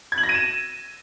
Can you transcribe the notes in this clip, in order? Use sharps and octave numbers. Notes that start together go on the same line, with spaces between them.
G#6
F#7
A#6
D#7
E7